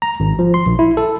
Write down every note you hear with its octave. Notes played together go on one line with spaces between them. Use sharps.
A#5
G#1
F3
C6
A#1
E4
A4